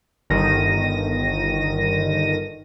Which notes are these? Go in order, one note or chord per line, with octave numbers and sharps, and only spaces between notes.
G1 D#3 A#6 D#7